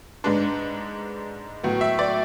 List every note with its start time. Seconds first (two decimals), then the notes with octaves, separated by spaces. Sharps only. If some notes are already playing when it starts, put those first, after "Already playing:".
0.24 G#2 G#3 D4 B4
1.63 A2 F#3 B3
1.81 E5
1.99 D5